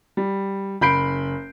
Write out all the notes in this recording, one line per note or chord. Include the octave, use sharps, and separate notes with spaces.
G3
F#1 B5 G6 C7 D7